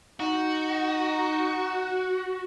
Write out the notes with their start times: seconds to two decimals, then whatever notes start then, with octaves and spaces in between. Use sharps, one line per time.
0.20 D#4 F#4